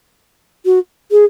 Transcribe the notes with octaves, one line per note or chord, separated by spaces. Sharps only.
F#4
G#4